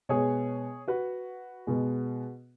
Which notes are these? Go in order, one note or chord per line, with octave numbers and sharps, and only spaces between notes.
B2 G#3 B3 G#4 C#5
F#4 B4
B2 G#3 B3